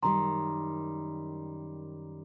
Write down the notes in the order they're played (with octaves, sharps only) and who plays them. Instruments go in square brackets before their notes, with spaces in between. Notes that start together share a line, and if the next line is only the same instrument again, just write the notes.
[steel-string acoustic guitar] F#2 D#3 G3 [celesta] A#5 C6